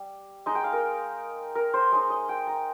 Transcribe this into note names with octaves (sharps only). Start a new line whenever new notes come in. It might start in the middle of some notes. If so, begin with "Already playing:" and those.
Already playing: G3
G#3 D#4
G5
F5
A#4
A#4
C5
G#3 D#4
D#5
G5
A#5